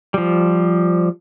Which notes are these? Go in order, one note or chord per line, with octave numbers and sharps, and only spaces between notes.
F3 G3